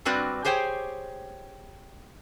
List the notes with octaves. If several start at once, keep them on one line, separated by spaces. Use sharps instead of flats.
G2 G3 C4 F#4 B4 D5
G4 G#4 C5 C#5 G5